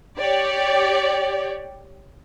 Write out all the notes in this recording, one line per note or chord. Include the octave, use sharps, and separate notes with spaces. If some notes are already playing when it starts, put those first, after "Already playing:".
G4 C#5 D5